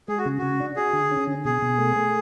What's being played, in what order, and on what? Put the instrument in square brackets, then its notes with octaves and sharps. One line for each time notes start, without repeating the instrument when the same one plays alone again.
[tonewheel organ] G#3 [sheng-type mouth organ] G#4
[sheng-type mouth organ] F#4
[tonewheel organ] C#3
[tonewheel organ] C#3 [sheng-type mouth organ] F#4
[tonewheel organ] D4
[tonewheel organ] F#4 [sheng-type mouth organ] G#4
[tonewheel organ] D3
C#4
D3
[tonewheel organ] B2 [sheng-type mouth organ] G#4
[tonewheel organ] B2
A3
A3